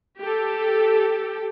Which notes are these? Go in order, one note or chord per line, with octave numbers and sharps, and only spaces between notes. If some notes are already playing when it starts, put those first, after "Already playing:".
G4 A4